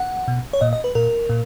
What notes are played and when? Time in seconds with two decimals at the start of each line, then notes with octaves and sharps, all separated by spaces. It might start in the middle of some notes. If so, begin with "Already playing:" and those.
Already playing: F#5
0.28 B2
0.53 C#5
0.61 A#2 D#5
0.73 D#5
0.84 B4
0.95 A#2 A#4
1.29 A#2